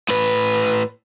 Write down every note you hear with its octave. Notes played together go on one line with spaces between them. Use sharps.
A2 B4